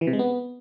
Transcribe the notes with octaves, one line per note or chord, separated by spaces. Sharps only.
E3
C3
G#3
B3